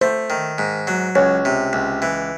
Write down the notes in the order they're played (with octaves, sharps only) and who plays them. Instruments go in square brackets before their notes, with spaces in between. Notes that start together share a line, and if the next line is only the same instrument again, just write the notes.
[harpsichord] A3 [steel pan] C5
[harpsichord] D#3
G#2
F#3
[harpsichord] C#2 [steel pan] C#5
[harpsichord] C3
C#2
E3